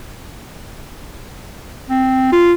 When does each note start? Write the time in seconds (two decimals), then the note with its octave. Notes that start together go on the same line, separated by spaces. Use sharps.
1.90 C4
2.33 F4